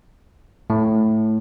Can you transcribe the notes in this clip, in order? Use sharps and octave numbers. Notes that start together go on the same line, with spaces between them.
A2